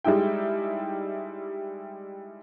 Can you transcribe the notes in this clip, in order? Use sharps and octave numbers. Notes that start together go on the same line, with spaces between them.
G3 G#3 D#4 E4 G5